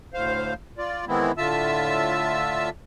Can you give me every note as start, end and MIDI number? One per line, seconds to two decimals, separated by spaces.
0.14 0.54 38
0.14 0.54 45
0.14 0.54 72
0.14 0.54 77
0.78 1.05 65
0.78 1.05 74
1.08 1.32 51
1.08 1.32 52
1.08 1.32 56
1.08 1.32 59
1.08 1.32 60
1.08 1.32 64
1.38 2.69 45
1.38 2.69 50
1.38 2.69 65
1.38 2.69 76
1.38 2.69 81
1.38 2.69 88